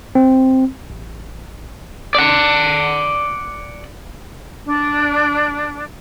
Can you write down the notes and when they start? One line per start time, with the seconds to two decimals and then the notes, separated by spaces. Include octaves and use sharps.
0.15 C4
0.90 A1
2.15 D5 F#5
4.65 D4